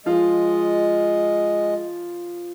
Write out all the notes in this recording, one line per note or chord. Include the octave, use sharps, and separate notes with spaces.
F3 G#3 F4 D#5